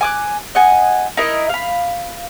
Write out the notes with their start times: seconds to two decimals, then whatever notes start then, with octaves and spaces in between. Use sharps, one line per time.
0.01 G#5 D6 F#6
0.55 D#5 F#5 G#5
1.17 D#4 E4 A#4 D#5
1.49 F5 B5